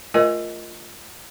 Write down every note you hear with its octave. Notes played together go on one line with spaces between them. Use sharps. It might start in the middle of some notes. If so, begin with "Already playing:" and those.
A3 F4 A#4 C5 D#5 G#5